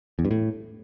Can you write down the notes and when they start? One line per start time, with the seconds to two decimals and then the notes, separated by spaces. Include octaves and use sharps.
0.19 E2
0.25 G2
0.31 A2